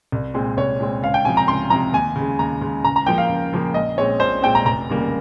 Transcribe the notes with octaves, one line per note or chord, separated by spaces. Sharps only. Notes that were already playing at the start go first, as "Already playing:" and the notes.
C2
A#2 G#3 C4
C2 C#5
A#2 G#3 C4
C#2 F5
G5
C3 F3 G#5
A#5
C#2 C6
C3 F3 A#5
D#2 G#5
C#3 G#3
D#2 A#5
C#3 G#3
C#2 A#5
A#5
C#3 F3 A#3 G5
F5
C#2
C#3 F3 A#3
A#1 D#5
A#2 G#3 C4 C#5
A#1 C5
A#2 G#3 C4 G5
A#5
F1 A#5
D#2 C#3 G3 A#3